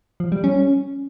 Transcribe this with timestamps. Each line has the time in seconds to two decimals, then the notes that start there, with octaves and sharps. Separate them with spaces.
0.20 F3
0.32 G3
0.44 C#4